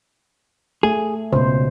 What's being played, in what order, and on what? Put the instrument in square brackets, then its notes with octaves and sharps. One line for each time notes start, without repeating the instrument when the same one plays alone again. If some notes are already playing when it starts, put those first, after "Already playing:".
[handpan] A3 [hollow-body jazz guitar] G#4
[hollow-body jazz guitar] C#2 [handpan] B2 C5